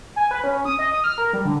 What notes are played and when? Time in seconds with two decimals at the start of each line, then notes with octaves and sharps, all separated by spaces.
0.16 G#5
0.31 B4
0.44 C#4
0.65 D#6
0.79 D#5
0.92 D#6
1.04 F6
1.18 A#4
1.33 G3
1.45 D3